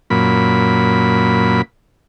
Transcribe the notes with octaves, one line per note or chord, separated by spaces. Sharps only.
F#2 A#2 B5